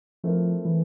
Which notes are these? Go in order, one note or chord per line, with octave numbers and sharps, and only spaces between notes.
F3 A3 C4 E4 A#4
E3